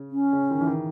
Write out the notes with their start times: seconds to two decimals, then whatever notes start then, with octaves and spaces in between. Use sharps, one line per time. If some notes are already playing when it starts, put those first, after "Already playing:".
Already playing: C#3
0.11 C#4
0.33 C#3
0.51 D#3
0.61 E3
0.67 D#3